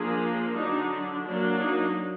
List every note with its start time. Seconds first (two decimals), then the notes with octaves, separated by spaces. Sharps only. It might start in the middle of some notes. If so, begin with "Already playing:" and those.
Already playing: F3 A#3 D4 G#4
0.57 D3 F#3 D4 D#4
1.25 F#3 A#3 D4
1.59 D#4